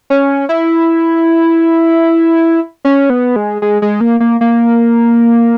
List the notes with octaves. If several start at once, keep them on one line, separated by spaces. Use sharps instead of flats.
C#4
E4
C#4
B3
G#3
G#3
G#3
A#3
A#3
A#3